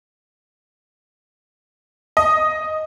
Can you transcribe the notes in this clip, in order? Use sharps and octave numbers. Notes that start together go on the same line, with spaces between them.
D#5